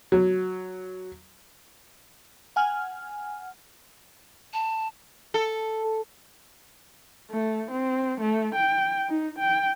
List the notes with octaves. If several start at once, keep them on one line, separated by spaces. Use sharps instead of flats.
F#3
F#5 G#5 F6
A5
A4
A3
C4
A3
G5
D#4
G5